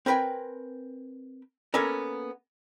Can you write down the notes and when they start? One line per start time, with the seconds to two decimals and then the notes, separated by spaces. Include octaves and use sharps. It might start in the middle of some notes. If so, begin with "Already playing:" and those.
0.06 C4 A#4 B4 G5 G#5
1.74 A#3 B3 C#4 A4 A#4